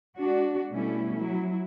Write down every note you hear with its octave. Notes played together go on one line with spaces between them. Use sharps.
G#3 D4 F#4
B2 G3 A3 C#4 E4
F#3 E4